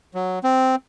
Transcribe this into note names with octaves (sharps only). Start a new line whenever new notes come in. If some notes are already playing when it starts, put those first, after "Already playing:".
F#3
C4